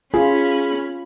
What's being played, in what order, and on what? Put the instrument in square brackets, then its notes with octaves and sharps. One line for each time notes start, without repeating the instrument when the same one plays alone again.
[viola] C#4 B5 [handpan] F4 [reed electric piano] G#4